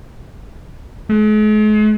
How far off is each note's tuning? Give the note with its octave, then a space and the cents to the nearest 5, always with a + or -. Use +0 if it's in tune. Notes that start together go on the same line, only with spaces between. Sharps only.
G#3 +45